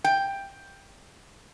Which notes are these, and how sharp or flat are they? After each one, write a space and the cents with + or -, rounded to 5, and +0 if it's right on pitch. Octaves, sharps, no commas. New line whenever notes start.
G5 +10